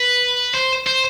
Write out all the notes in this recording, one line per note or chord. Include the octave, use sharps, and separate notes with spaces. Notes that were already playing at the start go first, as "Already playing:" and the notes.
Already playing: B4
C5
C5